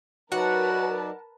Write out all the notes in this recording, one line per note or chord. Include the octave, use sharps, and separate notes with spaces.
F#3 D#4 F#4 A#4 B4 D5 F#5 A5